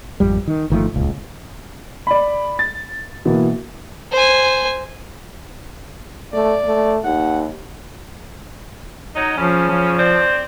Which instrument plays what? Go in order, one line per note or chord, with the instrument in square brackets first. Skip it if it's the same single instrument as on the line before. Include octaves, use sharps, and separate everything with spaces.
[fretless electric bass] G#1 F2 G3
D#3
G1 D#3 F3 A3
D#1 C#2
[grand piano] D5 B5
A6
B2 E3 A#3
[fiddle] C5 G#5
[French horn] A3 [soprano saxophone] D5
[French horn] A3
[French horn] D#2 [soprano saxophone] F#5
[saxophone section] F#3 D#4
[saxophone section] C#3 C#4 [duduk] F3
[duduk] F3
[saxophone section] C4 C5 D5